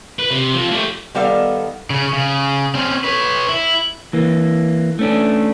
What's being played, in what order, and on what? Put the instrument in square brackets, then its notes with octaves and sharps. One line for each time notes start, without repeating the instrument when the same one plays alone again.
[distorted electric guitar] B4
C3
F3 C4
A3 G4
[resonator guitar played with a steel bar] D#3 G3 B3 A4 F5
[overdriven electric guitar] C#3
C#3
C4 C#4
B4 C#5
E4
[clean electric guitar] E3 A#3
A3 C#4 D4